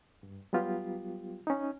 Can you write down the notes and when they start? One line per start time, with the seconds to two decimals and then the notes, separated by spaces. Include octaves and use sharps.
0.23 G2
0.53 F#3 G3 B3 F4 G4
1.47 C#4 D#4